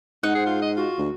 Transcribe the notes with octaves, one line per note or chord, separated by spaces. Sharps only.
G#2 D#4 F#5
G#4 C5
F4
D#5
F4 F#4
D2